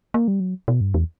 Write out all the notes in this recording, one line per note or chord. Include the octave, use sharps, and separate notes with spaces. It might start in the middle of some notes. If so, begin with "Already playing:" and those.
A#3
G3
F#3
B2
G2
E2